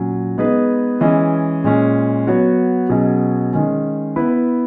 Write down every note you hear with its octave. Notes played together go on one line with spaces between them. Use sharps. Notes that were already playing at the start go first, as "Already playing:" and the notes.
Already playing: A#2 F#3 C#4
G#3 B3 D#4 G#4 B4
E3 G#3 C#4 G#4 D#5
A#2 G#3 C#4
F#3 B3 F#4 C#5
B2 F#3 C#4 G#4 D#5
D#3 G#3 C#4
B3 E4 B4